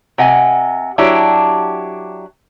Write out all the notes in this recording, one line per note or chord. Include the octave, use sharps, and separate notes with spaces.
C3 D#5 F#5 G#5
F#3 D4 E4 G4